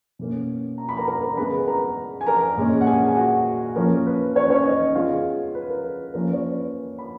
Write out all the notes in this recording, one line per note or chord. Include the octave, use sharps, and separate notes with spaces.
B2 A#3 C#4
A#5
B5
A#4 A#5
A#4 A#5
A#4 A#5
C#3 G#3 B3 B4 B5
A#4 A#5
G#5
A#4 A#5
A#2 G#3 C#4
F#5
G#4 G#5
G#5
F#4 F#5
F3 A#3 C#4 A#4
B4
C#4 C#5
C#4 C#5
D#4 D#5
C#3 G#3 B3 F4 F5
B4
A#4
F3 A#3 C#4 A#4
C#5
B4
B5